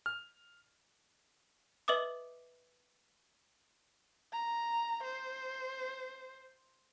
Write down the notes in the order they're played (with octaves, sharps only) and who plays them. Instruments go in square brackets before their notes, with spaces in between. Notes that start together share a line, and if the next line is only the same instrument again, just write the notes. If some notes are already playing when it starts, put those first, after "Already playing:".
[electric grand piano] F6
[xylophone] B4 D#5 E5 D6 D#6
[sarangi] A#5
C5